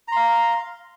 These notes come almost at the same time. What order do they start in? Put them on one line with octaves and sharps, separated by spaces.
A#5 C6 F5